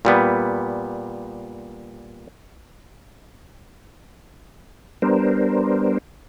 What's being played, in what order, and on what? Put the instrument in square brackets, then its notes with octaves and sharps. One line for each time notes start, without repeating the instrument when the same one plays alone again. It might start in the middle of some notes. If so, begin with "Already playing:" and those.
[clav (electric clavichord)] A#2 G3 B3
[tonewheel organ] G3 B3 D4 A#4 C5